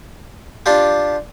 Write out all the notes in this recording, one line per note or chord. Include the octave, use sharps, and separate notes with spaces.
D4 F4 G4